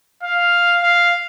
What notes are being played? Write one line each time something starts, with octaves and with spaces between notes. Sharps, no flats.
F5
F5